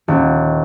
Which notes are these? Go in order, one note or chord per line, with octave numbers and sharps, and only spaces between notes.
D#1